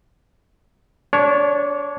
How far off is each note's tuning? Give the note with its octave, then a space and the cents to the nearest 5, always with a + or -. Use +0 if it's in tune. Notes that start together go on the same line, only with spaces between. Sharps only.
D4 -25 C#5 +0